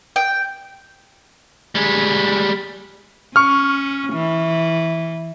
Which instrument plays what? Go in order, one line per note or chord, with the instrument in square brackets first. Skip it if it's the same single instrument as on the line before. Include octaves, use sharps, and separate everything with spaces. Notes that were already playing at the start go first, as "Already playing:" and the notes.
[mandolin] G5
[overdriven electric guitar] G3 G#3
[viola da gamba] C#4 [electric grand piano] C#6 F6
[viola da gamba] E3